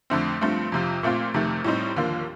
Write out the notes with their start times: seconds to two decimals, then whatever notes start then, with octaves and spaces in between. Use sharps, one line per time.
0.10 F2 D3 A3 C4
0.41 G2 F3 A3 C4
0.72 F2 C3 F3
1.03 A#2 A3 C4 F4
1.34 F2 C3 D#3 A3
1.65 A2 G3 C4 D#4
1.96 D#2 D3 F3 A#3